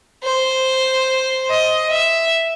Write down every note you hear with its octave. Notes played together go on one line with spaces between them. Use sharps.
C5
D#5
E5